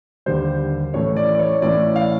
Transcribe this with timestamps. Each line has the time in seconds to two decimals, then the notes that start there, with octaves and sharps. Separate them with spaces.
0.26 D#2 D3 G3 C5
0.94 A2 E3 A3 C#4 C#5
1.16 D5
1.35 D5
1.39 C#5
1.62 A2 E3 A3 C#4 D5
1.96 F5